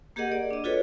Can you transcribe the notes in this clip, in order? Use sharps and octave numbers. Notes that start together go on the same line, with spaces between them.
A#3 G4 G#4 A#4 D#5 F#5
D5
D4 D#5
F4 F#4 G#4 A4 B4 C#5